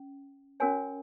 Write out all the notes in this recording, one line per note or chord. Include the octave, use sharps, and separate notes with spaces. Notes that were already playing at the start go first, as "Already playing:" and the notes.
Already playing: C#4
C#4 F#4 A#4 C#5 G#5